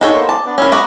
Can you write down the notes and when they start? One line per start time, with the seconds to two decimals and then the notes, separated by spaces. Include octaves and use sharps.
0.01 D4 D#4 G4 A4 C#5
0.13 A#3 B3 C5
0.29 D5 A5
0.46 B3 D4
0.58 C#4 E4 A#4 E5
0.72 B3 F#4 D5 A#5 D6 D#6